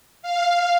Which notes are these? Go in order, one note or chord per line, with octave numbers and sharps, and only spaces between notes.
F5